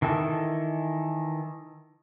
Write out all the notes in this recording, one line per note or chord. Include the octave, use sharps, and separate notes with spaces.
D#3 E3 A4